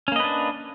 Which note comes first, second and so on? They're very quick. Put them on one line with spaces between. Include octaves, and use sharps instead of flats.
C#4 A#3 D#5 B4 D4